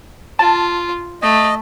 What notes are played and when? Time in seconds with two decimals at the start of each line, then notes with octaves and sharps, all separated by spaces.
0.39 F4 A5
1.22 A3 D#5